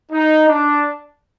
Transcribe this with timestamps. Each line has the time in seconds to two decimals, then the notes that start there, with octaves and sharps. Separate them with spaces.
0.12 D#4
0.48 D4